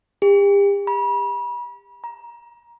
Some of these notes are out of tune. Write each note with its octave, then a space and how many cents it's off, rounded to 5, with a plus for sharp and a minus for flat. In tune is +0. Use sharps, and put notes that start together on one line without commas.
G4 +40
B5 -35
A#5 +25